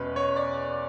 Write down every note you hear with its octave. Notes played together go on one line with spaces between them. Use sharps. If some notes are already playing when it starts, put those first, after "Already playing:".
Already playing: E2 B2 G#3 C#4 B4
C#5
D5